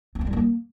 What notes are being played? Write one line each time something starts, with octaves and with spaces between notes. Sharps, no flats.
C4
C#4
G3
A#3